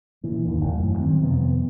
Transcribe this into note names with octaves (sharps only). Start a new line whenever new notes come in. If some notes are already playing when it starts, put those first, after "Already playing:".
A#2 E3
G1 D#2 D#3
E1
F#2 A2
D#3 G3 C4
F2 C3 B3